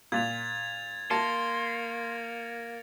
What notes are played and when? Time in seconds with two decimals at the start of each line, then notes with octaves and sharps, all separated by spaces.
0.12 A#2 G#6 A6 F7
1.11 A#3 A5 C6 A#6 C#7